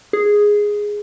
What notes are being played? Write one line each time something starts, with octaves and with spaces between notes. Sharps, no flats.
G#4